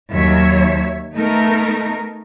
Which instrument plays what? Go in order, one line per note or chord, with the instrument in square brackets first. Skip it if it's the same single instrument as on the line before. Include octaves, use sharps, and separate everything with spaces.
[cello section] D#2 F#3 C#5 E5
A3 B3 D#4 A#4